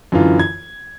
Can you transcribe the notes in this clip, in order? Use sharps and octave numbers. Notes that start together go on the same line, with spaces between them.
F#2 D3 E3 F4
G#6